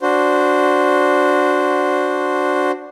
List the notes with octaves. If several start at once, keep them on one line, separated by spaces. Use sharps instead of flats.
D4 F#4 C5